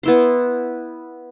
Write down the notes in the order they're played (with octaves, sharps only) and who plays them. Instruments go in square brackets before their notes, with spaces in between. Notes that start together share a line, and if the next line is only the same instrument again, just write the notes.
[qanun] B3 E4 C6